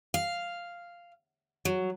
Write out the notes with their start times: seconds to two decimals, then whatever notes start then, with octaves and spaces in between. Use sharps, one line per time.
0.14 F5
1.65 F#3